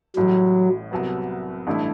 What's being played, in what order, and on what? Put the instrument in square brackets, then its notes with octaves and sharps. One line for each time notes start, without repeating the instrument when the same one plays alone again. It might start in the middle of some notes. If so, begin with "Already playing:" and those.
[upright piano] A1 A2 G3 [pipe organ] F#3
[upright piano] C2 C3 F#3 B3
A1 G2 D3 A3 E4